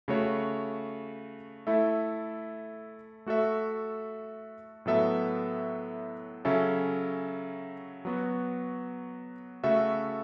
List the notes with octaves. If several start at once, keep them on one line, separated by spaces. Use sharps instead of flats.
C#3 A3 F#4 C#5
A3 E4 A4 E5
A3 F#4 A4 E5
A2 F#3 B3 A4 E5
C#3 F#3 C#4 A4 E5
F#3 B3 F#4
C#3 A3 F#4 A4 E5